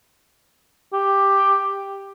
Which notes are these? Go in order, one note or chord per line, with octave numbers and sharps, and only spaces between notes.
G4